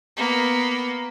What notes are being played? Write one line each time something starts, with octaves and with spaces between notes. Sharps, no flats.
A#3 B3